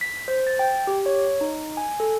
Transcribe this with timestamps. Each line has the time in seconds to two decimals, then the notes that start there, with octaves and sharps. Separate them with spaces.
0.01 B6
0.28 C5
0.47 A6
0.59 G5
0.87 G4
1.06 C#5
1.41 D#4
1.77 G#5
2.00 A4